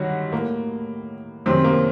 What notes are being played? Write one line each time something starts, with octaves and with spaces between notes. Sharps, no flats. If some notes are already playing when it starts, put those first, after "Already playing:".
Already playing: G2 D3 D#3 F#3 G3 F#4
A2 A#3
F#2 C3 D#3 C4
A#3